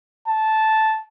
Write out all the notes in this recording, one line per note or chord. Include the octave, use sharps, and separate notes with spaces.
A5